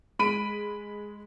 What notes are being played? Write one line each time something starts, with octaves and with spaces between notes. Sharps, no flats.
G#3 B5 D7 D#7